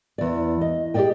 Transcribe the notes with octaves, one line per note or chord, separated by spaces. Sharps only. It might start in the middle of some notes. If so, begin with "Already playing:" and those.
E2 D5
D#5
G4 G#4 C5 D5 D#5 G5